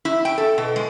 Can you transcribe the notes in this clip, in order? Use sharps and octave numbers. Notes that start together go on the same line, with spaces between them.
E4
G5
A4
B2
G#3